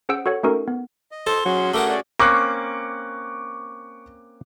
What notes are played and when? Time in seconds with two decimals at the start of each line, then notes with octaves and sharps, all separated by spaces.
0.09 C#4 G#4 C5 F#5 E6 D7
0.26 F#4 A4 C#5 F#5
0.43 A3 C#4 D#4 F#4 A4 A#4
0.68 B3
1.11 D#5
1.27 A4 C5 C6
1.46 F#3 C#4 F#4 G#4
1.74 A3 A4 A#4 F#5 D6
1.89 D5
2.20 A#3 C4 C#4 C#6 D6 F#6